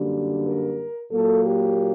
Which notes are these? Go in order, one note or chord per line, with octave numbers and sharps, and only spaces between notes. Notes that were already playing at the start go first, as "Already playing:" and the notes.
Already playing: F#2 D3 G3 A#3
A#4
A#2 F#3 A#3 A4
G4